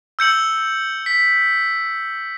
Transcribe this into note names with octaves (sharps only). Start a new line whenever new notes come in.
E6 G6 C#7 F#7
B6